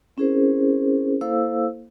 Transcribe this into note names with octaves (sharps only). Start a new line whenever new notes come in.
C4 C#4 E4 G#4 A#4 C5
A#3 E4 A4 C5 F5 E6